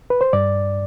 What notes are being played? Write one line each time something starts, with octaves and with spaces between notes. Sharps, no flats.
B4
C5
G2 D5